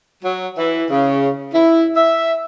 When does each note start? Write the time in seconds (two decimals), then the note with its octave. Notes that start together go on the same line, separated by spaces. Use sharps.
0.23 F#3
0.58 E3
0.90 C#3
1.53 E4
1.97 E5